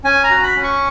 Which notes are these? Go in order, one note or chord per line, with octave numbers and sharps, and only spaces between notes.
C#4 G#5
A#5
F#4
B5
C#4
C#6